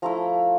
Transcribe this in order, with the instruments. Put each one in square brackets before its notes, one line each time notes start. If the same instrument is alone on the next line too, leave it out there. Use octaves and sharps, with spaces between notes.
[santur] F3 A3 E4 A#5